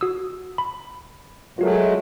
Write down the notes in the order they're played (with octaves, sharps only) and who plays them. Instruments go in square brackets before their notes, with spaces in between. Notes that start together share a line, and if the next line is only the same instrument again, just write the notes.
[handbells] F#4 D#6 E6
B5
[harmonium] F#3 G#3 A3 [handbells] F4 F#4 A#4